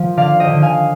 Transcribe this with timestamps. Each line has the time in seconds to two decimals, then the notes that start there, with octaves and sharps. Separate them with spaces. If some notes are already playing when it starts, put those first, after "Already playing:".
Already playing: F3
0.17 D3 D5 F5
0.40 D#5 G5
0.48 D3
0.62 F5 G#5